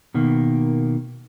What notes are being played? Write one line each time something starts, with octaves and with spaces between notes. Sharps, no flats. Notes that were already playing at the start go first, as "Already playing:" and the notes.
B2 D#3 A#3